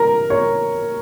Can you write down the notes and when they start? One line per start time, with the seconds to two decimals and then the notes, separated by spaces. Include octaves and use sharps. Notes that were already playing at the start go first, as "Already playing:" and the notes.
Already playing: A#4
0.30 C#5